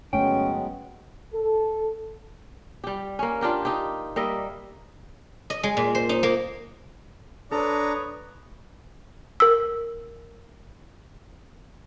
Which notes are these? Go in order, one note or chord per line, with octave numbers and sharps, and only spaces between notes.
G1 F#3 G#3 A3 B3 C#4 G5
A4
G3 G4
A#3 C#4
D4 F4 G4 A#4
D#4 G4
G3 A#3 D#5 E5
D#5
G#3
A#2
C5
D#4
A#3
D4 A4 B4 C#5 A#5 D#6
A#4 E6